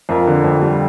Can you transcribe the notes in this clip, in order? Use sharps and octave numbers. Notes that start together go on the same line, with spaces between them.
F2 F4 A#4
D3
F2
G3